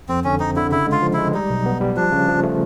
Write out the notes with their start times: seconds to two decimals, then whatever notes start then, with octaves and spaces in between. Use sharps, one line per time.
0.09 F2 C4
0.24 D3 C#4
0.40 C4 D#4
0.56 D3 E4
0.71 C#3 E4
0.87 G#3
0.92 F4
1.02 F3
1.13 G#3 E4
1.34 G3 D#4
1.50 B1
1.66 B3
1.81 G3
1.96 F3 D4
2.12 C#3
2.28 F3
2.43 A3